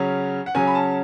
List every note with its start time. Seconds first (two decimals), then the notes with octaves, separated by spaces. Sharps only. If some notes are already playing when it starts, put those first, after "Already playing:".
Already playing: C#3 F#3 C#4
0.46 F#5
0.55 C#3 F#3 C#4 G#5
0.67 B5
0.75 A5